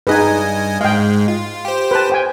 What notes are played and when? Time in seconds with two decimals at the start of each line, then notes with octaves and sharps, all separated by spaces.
0.07 G2 D#4 G#4 B4 D#5 G#5
0.81 G#2 G#3 F5 G5
1.28 F4
1.65 G4 C5
1.91 B4 A5
2.10 C5 G5 G#5